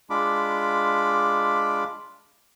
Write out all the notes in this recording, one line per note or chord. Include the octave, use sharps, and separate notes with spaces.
G#3 D4 F4 B5 D6